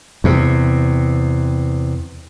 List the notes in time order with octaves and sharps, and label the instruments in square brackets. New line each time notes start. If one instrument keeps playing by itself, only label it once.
[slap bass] E2 C3